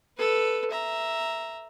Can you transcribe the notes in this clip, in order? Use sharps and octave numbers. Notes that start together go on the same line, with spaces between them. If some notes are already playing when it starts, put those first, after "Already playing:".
A4 B4
E5 A#5